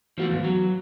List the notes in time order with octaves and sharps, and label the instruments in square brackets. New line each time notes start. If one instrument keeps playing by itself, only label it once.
[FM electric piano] E3 B3 F#4 [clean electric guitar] F3 G#3 A3
[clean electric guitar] D#2 G#2
F#3